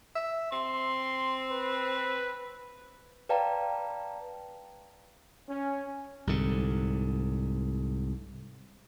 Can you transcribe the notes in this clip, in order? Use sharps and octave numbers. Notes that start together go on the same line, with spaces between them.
E5
C4 C6
B4
B4 D5 F5 G5 A5 A#5
C#4
C2 G#2 D3